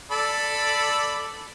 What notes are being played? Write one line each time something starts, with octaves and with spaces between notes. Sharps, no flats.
A4 D5 B5